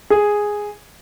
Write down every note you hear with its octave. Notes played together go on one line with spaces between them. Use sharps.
G#4